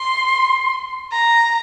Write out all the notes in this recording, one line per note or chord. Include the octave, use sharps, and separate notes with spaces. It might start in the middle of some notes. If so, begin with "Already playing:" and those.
Already playing: C6
A#5